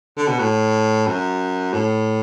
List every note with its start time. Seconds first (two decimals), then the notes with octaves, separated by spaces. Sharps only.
0.17 D3
0.28 B2
0.39 A2
1.07 F#2
1.74 A2